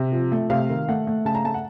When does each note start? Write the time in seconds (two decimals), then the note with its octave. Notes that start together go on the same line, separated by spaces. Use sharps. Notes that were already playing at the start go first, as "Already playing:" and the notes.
Already playing: C3
0.12 F3
0.32 A3
0.50 C3 F5
0.69 D#3
0.89 A3 F#5
1.07 A3
1.25 C#3 A5
1.35 A#5
1.45 A3 A5
1.54 F#5